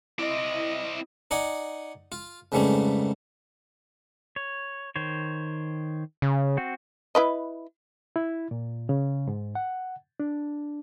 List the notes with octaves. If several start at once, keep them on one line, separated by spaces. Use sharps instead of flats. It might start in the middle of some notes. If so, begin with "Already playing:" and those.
C4 E4 D5 D#5
D#4 D5 F#5 G#5
F4
F2 G#2 C#3 E3 G3 A3
C#5
D#3 C5 C#5
C#3
C4 F#4
E4 B4 D#5
E4
A#2
C#3
G#2
F#5
D4